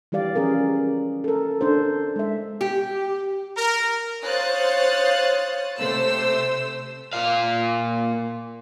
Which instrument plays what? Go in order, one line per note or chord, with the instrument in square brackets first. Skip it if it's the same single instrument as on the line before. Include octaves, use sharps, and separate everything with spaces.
[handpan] E3 G3 G4 D5 F5
F3 C#4 G#4 A#4
A4 A#4
D4 A4 C5
G#3 E5
[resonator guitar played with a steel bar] G4
[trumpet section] A#4
[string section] C5 C#5 F5 D#6 F#6 A6
C3 A3 C5 E6
[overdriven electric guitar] A#2 F5